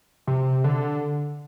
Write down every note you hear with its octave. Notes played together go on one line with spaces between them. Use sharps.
C3
D3